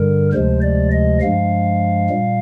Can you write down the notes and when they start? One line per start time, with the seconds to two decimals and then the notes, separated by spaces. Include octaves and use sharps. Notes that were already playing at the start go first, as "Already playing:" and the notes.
Already playing: G2 D3 G3 A#4
0.33 D2 C3 F3 G#3 C5
0.62 D5
0.92 D#5
1.21 G2 F3 G#3 F5
2.10 A#2 G3